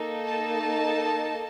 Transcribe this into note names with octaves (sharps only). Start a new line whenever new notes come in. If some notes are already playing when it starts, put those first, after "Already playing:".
Already playing: A#3 D#4 A4
A5